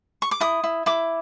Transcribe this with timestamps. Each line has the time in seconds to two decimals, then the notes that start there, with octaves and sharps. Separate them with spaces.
0.22 C#6
0.31 D6
0.41 E4 D#6
0.64 E4
0.86 E4 D6